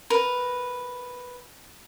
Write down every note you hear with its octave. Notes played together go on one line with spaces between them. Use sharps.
A#4 B4